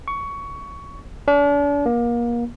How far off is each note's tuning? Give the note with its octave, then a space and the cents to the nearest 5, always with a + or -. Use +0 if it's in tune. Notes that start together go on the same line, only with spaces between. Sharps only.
C#6 +15
D4 -40
A#3 +30